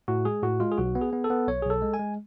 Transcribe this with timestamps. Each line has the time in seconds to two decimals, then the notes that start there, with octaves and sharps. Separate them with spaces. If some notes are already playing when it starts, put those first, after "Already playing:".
0.08 A2 F#4
0.25 G#3 G#4
0.43 A2 F#4
0.60 G#3 F4
0.71 G#4
0.78 B1 F#4
0.95 B3
1.01 G#4
1.13 B3
1.24 A4
1.30 B3
1.48 B1 C#5
1.62 B1 G#4
1.70 A4
1.82 G#3
1.94 G#5
1.99 G#3